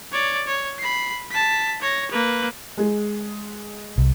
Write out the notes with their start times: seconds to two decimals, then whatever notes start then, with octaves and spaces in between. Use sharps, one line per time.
0.12 C#5 D5
0.47 C#5
0.79 B5 C7
1.32 A5 B6
1.81 C#5 A#6
2.11 A#3 B4
2.77 G#3 G#4
3.98 C2